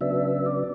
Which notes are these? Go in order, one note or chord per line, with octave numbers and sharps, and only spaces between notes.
C#3 F#3 B3 D4 E5
D5